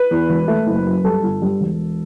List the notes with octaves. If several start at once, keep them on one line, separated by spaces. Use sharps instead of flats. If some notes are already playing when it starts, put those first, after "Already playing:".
Already playing: B4
E2
E1
A3
F#1
F#2
G2 A4
G1
G2
E1